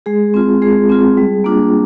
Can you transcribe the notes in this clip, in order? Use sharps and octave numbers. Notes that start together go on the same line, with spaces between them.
G#3 G#4
C4 F4
G#3 G#4
C4 F4
G3
A#3 D4 F4